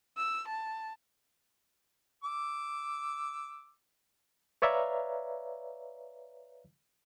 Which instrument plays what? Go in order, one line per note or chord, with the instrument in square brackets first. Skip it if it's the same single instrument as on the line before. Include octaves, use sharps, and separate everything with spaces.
[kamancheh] E6
A5
[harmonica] D6 E6
[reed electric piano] B4 C#5 D5 E5 F5 A#5